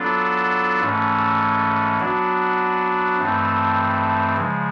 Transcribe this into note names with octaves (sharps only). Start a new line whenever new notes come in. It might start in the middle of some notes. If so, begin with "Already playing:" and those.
Already playing: F#3 B3 D4 F4 A4
G#2 E3 A3 C#4
F#3 B3 D4 F#4
G2 E3 A3 C4 D#4
C#3 F3 G#3